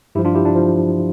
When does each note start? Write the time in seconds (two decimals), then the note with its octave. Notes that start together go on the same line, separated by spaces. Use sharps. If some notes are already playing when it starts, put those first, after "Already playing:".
0.15 G2 E4 G4
0.19 F3
0.25 D4 F4
0.34 E4 G4
0.45 D4
0.55 F3